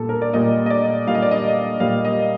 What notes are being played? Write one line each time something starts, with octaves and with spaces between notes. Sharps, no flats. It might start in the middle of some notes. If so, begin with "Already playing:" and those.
Already playing: A#2 G3 A#3 A4
A#4
D5
A#2 G3 A#3 D#5
D#5
D5
A#2 G3 A#3 F5
D#5
D5
D#5
A#2 G3 A#3 F5
D#5